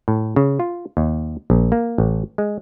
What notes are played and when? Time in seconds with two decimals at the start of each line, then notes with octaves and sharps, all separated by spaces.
0.08 A2
0.36 C#3
0.60 F4
0.97 D#2
1.50 A#1
1.72 A#3
1.98 A1
2.38 G#3